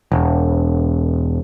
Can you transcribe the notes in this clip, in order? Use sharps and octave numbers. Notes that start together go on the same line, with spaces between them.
E1